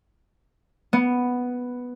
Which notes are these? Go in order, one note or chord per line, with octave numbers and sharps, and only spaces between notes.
B3